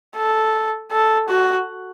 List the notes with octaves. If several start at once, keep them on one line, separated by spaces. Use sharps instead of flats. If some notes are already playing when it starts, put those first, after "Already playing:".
A4
A4
F#4